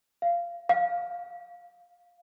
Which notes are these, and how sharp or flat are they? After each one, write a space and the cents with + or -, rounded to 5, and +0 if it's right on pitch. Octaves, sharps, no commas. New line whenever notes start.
F5 -15
F5 +10